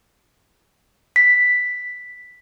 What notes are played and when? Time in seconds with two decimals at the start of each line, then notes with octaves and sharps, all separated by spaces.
1.16 B6